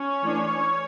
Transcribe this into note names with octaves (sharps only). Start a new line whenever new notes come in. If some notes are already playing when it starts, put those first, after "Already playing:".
Already playing: C#4 C#5
E3 A3 D4